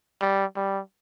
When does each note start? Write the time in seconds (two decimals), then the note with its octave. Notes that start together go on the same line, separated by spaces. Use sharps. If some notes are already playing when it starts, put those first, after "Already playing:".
0.21 G3
0.56 G3